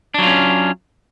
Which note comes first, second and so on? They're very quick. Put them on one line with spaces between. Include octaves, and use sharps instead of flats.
D4 F#3 F4 C#4